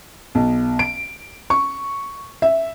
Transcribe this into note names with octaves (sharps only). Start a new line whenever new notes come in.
B1
D7
C#6
E5